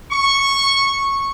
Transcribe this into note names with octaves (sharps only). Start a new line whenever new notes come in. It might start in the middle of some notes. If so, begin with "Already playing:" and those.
C#6